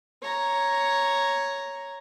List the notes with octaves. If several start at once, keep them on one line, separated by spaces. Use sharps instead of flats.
C#5 A#5